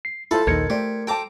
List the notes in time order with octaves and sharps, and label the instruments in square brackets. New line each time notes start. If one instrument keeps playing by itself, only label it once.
[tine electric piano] C7
[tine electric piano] E4 [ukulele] F4 C5 [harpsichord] A4 A5 B5
[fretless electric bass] A#1 D#2 D#3 [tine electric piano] A#4 G#6 C#7 [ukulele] C5 D#5
[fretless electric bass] A3 [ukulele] E4 C5 D5 [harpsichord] G4
[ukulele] A4 C5 A5 [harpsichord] G5 A#5 D6